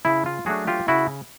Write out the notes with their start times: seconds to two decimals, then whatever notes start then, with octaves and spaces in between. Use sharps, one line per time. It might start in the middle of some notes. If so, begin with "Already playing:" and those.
0.05 C#3 E4
0.26 F4
0.46 F#3 A3 D4 F#4 G#4
0.67 F4 G4
0.88 C#3 E4 F#4